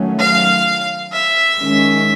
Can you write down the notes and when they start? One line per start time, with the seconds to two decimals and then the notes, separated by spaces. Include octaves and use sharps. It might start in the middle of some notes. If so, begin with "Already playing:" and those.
Already playing: D#3 F#3 A3 C#4
0.19 F5
1.13 E5
1.59 D#3 G#3 C#4